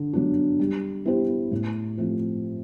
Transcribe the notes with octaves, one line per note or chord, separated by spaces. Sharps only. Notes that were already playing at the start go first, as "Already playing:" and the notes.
Already playing: D3
F#3 B3 D4
G3
B3 E4 G4 C5
A2
F3 A3 C4 F4